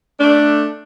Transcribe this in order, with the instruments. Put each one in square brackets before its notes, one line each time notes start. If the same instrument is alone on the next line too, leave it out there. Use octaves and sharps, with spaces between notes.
[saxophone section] A3 D4